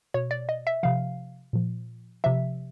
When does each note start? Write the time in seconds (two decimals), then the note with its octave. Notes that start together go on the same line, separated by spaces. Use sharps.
0.14 B2 C#5
0.31 D5
0.49 D#5
0.67 E5
0.83 C3 F3 F5
1.53 A#2 F3
2.24 C3 F3 E5